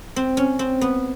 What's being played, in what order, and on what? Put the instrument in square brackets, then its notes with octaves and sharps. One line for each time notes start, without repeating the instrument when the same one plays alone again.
[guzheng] C4
C#4
C4
B3